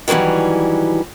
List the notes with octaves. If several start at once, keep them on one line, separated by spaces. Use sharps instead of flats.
D#3 E3 F#3 G3 C#4